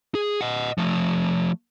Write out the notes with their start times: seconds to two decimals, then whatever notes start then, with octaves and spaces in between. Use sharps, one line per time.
0.15 G#4
0.41 D#5 F#5
0.78 F3 A3